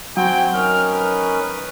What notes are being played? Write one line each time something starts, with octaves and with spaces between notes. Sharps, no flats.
F#3 C4 F#4 G5 G#5
C#4 D#4 A#4 F6
B4